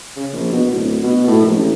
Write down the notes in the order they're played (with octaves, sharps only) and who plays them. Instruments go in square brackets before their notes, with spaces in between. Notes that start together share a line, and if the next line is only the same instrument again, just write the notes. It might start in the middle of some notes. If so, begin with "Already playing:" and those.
[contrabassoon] C#3
A#1
B2
D1
B2
A2
A#1
A1